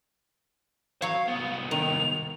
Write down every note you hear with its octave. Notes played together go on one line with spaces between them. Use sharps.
F#3 C#5 F5
C2 B3
D#3 F7